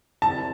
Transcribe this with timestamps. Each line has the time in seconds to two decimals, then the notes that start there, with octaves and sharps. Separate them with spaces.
0.22 D#3 G3 C4 E4 A5